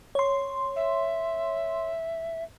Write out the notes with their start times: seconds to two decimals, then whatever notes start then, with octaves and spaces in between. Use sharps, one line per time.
0.15 C#5 C6
0.76 E5